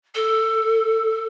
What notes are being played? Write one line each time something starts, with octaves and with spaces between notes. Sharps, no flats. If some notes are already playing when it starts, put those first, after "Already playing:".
A4